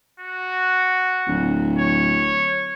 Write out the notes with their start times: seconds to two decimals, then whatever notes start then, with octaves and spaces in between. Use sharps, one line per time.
0.19 F#4
1.27 D1
1.78 C#5